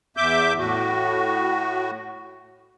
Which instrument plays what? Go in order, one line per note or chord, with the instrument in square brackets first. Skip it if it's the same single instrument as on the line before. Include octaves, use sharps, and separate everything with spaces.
[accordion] E2 E5 D6 G6
A2 F#4